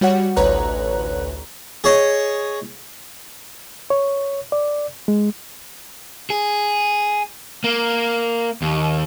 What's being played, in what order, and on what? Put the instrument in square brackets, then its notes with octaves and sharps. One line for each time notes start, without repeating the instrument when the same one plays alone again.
[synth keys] G3 F#4 C#5 F#5
A1 D2 B4 C#5 A#5 F#6
[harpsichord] G#4 C#5 D#5
[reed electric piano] C#5
D5
G#3
[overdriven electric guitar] G#4
A#3
D#2